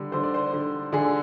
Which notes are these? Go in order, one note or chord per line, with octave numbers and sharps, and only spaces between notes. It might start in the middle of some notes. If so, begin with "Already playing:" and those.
Already playing: D3 G3
D3 C5
D5
C5
D3
D3 G#4